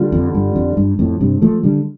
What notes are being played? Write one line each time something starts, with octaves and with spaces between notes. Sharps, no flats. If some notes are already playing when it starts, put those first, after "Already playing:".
Already playing: D3 G3 F4
F2
G2
F2
G2
F2 A2
G2 C3
F3 A3
D3 G3